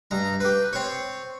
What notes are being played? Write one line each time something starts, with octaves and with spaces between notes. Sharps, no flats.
G2 A#5
G4 B4
C4 C#5